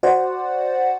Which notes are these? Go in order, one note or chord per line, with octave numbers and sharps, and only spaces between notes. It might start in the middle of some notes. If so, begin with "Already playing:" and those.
F#4 C5 D5 F#5